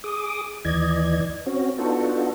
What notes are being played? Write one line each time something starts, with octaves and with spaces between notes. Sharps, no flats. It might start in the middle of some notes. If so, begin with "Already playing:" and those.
G#4 D6 D#6
D#2 E3 D5 D#5 G#6
C4 C#4 F#4
B3 D4 D#4 F4 F#4 A4